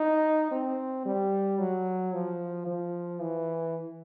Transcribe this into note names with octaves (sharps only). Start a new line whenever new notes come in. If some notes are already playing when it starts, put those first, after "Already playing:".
Already playing: D#4
C4
G3
F#3
F3
F3
E3